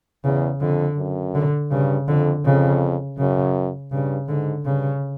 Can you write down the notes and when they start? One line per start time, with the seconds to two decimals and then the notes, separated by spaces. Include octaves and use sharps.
0.24 E2 C#3
0.61 F2 D3
0.97 F#2
1.35 D3
1.71 G2 C#3
2.08 F2 D3
2.45 F2 C#3
3.18 F#2 C#3
3.92 G2 C#3
4.28 G#2 D3
4.65 G2 C#3